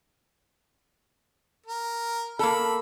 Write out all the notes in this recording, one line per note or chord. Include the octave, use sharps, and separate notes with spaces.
A#4
A#3 A4 B5